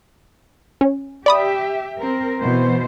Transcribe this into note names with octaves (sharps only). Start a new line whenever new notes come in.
C#4
G4 D5 E5 B5 D#6
C4 A#4
B2 E3 C5